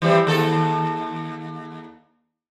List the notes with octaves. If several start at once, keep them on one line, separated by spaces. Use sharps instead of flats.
E3 G3 C4
D#2 A4